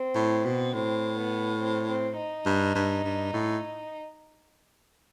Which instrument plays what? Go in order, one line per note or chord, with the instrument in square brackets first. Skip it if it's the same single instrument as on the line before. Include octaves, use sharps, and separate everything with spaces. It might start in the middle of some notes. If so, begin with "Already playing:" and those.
Already playing: [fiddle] C4
[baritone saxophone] A2
B2
[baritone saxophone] A2 [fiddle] C4
[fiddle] B3
C4
C4
D#4
[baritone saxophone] G2
G2
G2
A2